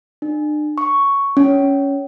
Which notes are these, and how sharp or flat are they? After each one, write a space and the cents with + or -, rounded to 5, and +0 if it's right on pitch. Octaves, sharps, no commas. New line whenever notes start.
D4 +40
C#6 +5
C#4 +10